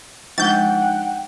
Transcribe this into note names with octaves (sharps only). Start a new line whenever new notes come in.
F3 G#3 D#4 F#5 G5 G6 A6